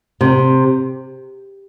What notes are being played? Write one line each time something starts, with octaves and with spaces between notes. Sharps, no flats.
C3